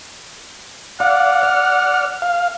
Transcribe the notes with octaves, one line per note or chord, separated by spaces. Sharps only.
D5 F5 F#5
D5 F6
F5